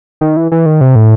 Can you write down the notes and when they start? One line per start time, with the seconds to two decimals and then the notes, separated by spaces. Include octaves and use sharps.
0.21 D#3
0.37 E3
0.52 E3
0.66 D#3
0.81 C3
0.96 A2